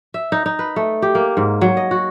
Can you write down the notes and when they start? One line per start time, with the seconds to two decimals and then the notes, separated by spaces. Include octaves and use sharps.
0.14 E5
0.32 D#4
0.46 D#4
0.59 B4
0.76 A3
1.02 G4
1.15 A#3
1.37 G#2
1.61 F#3
1.77 D#5
1.91 F#4